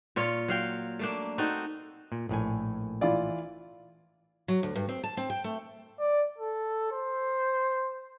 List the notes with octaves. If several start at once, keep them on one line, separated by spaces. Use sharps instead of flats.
A#2 F4 C#5
F#3 F5 G5
A3 A#3 D4
C4 D#4 F#4 A4
A#2
A#1 A2 G#5
E3 F4 D5
F#3
D2
G2
C4
A5
C4
G5
A3
D5
A4
C5